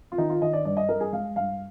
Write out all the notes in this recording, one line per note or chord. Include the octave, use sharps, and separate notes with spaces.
F4
D#3 D#4
F4
D#3 D#5
D5
G2 D5
D#5
G2 A#4
G#4
G#3 F5
G2 F5